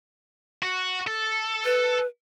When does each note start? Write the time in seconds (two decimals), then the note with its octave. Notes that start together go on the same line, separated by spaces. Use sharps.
0.63 F#4
1.07 A4
1.65 B4